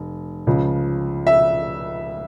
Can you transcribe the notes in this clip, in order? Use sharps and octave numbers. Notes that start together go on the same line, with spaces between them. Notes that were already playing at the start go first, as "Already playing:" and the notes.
Already playing: F1
C#2 C#3 F3
E5